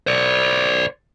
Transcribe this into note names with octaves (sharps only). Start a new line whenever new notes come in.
C5 D5